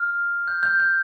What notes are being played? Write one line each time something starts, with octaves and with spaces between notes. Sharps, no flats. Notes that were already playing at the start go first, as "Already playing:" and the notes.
Already playing: F6
G6
G6
G6